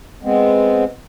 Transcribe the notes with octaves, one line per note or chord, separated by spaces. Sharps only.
G#3 B3 C4